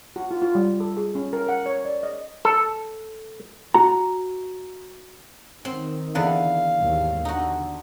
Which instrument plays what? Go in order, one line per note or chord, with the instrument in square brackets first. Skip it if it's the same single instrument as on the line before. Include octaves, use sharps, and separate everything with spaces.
[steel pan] F#4
F4
F4
G3
A4
G#4
C#4
A#4
F#5
C#5
D5
D#5
[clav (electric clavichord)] A4
[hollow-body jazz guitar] F#4 A#5
[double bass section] D#3 [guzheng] C4
[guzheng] E2 D3 B4 [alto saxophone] F5
[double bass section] D#2 G#2
[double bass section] D3 [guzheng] D#4 F#4